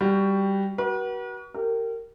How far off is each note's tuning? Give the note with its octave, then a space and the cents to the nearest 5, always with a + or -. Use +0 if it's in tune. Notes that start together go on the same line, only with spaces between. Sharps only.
G3 +0 F#4 +15
F#4 +35 B4 -45
G4 -20 A#4 -25